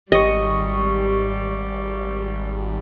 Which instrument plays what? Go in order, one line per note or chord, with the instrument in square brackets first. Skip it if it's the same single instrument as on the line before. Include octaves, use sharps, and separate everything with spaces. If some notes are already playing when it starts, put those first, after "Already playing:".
[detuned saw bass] G#1 [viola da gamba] G3 [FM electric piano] G4 C#6 [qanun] D#5